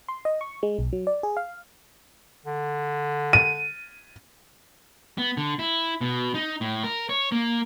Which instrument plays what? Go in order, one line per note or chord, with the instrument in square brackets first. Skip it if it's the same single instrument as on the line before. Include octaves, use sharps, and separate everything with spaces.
[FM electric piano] C6
D#5
C#6
G#3
B1
F#3
D5
G#4
F5
[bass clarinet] D3
[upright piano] D#7
[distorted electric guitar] B3
D3
E4
B2
D#4
A2
A#4
C#5
A#3